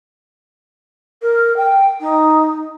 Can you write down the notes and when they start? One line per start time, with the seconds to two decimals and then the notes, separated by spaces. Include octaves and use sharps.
1.22 A#4
1.57 G5
2.00 D#4